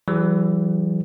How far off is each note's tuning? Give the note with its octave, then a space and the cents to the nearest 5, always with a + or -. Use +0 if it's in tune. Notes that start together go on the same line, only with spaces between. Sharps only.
E3 +25 G3 -45 G#4 +0